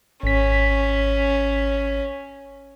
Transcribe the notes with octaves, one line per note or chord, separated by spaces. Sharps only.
G#1 C#4 B6